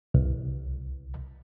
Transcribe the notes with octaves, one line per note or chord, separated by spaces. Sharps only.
C2